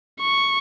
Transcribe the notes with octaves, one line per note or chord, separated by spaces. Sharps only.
C#6